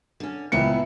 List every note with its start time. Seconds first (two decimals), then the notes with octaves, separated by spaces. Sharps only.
0.20 D3 C#4
0.52 C#2 A#2 B3 E4 C#7